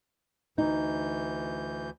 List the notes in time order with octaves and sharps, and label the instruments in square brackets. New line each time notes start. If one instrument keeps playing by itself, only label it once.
[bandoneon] D2 E3 G6 [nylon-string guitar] D#4